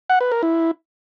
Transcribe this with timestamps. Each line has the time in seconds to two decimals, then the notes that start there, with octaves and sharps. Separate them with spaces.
0.10 F#5
0.21 B4
0.32 A#4
0.43 E4